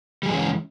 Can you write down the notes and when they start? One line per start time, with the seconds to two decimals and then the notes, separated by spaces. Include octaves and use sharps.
0.23 G3
0.26 G#4
0.28 E3
0.31 G#3
0.34 C#4